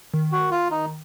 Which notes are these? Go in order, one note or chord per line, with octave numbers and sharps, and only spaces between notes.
D#3
F#4
F4
D#4